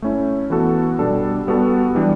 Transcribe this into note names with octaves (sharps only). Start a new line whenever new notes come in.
A3 C#4 E4
E3 B3 F#4 A4
B2 G3 D4 A4
G3 B3 F#4 A4
E3 G3 D4